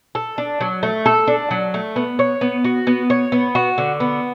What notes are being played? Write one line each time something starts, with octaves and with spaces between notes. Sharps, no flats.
A4
D4
F#3
A3
A4
D4
F#3
A3
B3
C#5
B3
F#4
B3
C#5
B3
F#4
D3
B3